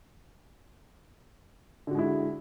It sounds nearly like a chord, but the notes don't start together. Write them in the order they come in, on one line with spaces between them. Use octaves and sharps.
D3 F#4 G#3 E4